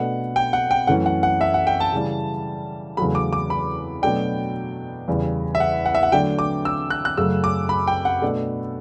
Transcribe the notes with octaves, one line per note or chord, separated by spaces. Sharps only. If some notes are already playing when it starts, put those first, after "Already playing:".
Already playing: B2 A3 D4 F#5
G5
F#5
G5
F#2 E3 A3 C#4 F#5
F#5
F#5
E5
F#5
G5
A5
C#3 E3 G3
E2 C#3 F#3 A3 B5
D6
D6
B5
B2 F#3 A3 D4 G5
E2 C#3 G3
E5
F#5
F#5
E5
F#5
D3 F#3 A3 D4 G5
D6
E6
F#6
F#6
F#2 C#3 F#3 A3 E6
D6
B5
G5
F#5
B2 A3 D4